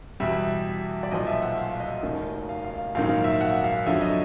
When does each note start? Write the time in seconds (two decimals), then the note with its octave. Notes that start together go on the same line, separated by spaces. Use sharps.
0.20 E2 B2 G3 E5
1.03 D5
1.11 B1 A#2 F3 D#5
1.27 E5
1.42 F#5
1.58 F5
1.80 D#5
2.03 F1 D#2 D#3
2.49 F5
2.64 F5
2.95 A#1 G#2 D#3 F#3 F5
3.24 E5
3.32 F5
3.41 F#5
3.64 F5
3.86 F2 D3 F#3 E5
4.01 D#5